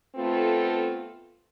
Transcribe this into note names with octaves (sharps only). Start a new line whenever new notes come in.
A3 B3 C4 F4 A4